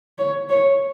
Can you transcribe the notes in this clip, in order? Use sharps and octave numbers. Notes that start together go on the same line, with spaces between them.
C#5
C#5